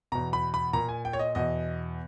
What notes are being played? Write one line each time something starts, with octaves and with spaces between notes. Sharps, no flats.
E2 B2 A#5
B5
B5
A#2 A#5
G#5
G5
C#5
D#5
E2 B2 D#5